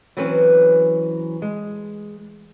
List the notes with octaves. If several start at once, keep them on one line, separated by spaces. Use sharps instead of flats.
E3 F#3 C4 C#4 B4
G#3